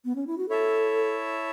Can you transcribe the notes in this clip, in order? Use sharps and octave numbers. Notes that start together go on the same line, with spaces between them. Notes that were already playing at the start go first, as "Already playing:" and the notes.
B3
C#4
E4
F#4
E4 A4 C#5 E5 A5